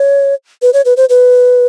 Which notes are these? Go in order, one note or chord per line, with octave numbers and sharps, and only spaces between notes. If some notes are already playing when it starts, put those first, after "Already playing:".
Already playing: C#5
B4
C#5
B4
C5
B4